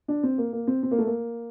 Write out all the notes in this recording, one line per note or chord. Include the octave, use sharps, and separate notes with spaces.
D4
C4
A#3
A#3
C4
C4
A#3
A3
A#3